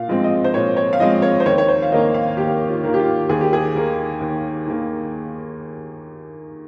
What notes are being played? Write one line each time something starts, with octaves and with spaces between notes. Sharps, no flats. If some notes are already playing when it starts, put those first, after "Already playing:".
Already playing: A#2 F5
F3 G#3 C4
D#5
C5
A#2 C#5
C#5
F5
F3 G#3 C4 D#5
C#5
C5
D#2 C#5
C#5
C5
F5
D#3 A#3 D#5
F5
D#2 G4
F4
D#3 A#3
G4
F4
D#2 G#4
G4
G#4
D#3 A#3
D#2
D#3 A#3